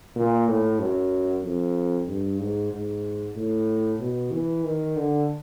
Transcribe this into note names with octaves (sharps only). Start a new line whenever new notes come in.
A#2
A2
F#2
F2
G2
G#2
G#2
A2
B2
E3
D#3
D3